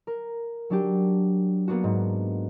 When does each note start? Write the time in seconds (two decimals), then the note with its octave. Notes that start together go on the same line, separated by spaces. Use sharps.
0.07 A#4
0.70 F#3 D4 G4
1.68 A#3 B3 D4 F#4
1.84 G#2